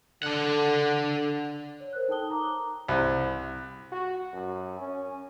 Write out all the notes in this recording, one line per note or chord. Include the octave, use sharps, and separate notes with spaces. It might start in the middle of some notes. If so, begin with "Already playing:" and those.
D3 A4 F#5
C#5
A#4 C5 F#6
D#4 A4 G5 A5 D#6 G7
A#5 D6
C2
F#4
F#2
C#4